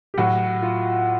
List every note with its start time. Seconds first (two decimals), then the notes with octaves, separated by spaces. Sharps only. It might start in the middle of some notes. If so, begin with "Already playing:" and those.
0.14 G4
0.18 A2 F#3 F#4
0.62 F4